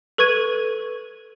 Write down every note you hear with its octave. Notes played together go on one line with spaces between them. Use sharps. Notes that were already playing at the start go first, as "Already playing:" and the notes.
A4 B4 C#6 G#6 D#7